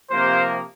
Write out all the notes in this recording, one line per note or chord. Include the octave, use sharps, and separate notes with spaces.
C3 F3 A#3 C5